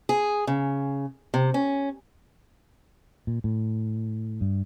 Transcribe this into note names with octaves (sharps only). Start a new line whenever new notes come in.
G#4
C#3
C3
C#4
A#2
A2
G2